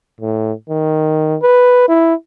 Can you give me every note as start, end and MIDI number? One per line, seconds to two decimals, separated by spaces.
0.21 0.52 45
0.69 1.36 51
1.42 1.84 71
1.88 2.14 64